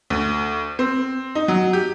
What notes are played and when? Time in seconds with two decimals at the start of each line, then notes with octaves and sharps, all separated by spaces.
0.10 D2
0.79 C4
1.35 D#4
1.48 F#3
1.73 G4